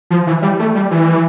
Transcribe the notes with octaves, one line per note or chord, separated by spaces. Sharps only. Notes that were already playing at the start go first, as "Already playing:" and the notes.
F3
E3
G3
A3
G3
E3